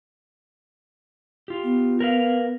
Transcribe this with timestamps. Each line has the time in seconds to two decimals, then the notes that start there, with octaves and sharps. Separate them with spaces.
1.48 F4 G4
1.63 B3
2.00 A#4 B4 F5